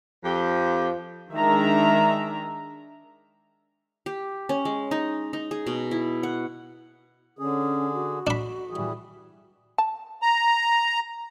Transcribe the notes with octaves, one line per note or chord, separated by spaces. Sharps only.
F2 F3 G4
D#3 G#3 D4 E5 A#5
G4
C#4
G#3
D#4
D#4
G#4
B2
E4
F#5
D3 C#4 G#4
F#4
D4 B5
E3 G3 G#4
A5
A#5